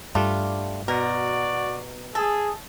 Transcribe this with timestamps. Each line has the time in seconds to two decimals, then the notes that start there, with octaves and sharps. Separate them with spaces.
0.15 G2 G3 A3 D4 F4
0.88 B2 F#4 A#4 D5
2.15 G#4 A4